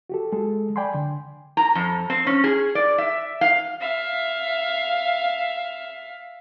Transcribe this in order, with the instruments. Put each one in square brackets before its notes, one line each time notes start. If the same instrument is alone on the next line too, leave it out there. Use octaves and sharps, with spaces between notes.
[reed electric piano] F#4 G4 A4
G#3 G#4 A4
D5 G5 G#5 B5 C6
D3
[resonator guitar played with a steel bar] A#5
F2
C4
C#4
G#4
D5
E5
F5
[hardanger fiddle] E5 F5